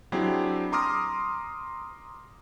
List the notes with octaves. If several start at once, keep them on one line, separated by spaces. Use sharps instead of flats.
F#3 C4 D4 E4 G4 G#4
A#5 C6 D6 D#6 F6 A#6